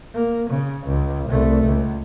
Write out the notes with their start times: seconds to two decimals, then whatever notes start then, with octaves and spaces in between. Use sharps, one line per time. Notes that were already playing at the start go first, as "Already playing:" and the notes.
0.14 A#3
0.50 C#3
0.86 C#2
1.29 C2 A3
1.65 C#2